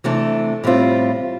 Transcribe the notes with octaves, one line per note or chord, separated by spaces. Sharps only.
C3 E3 A3 D4
A2 G3 C4 F4